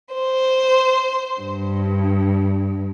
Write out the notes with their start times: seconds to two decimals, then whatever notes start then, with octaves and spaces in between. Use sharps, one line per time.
0.14 C5
1.42 G2